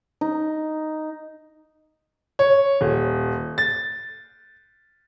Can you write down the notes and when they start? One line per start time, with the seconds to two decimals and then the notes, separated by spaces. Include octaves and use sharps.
0.21 D#4
2.39 C#5
2.81 D#1
3.58 A6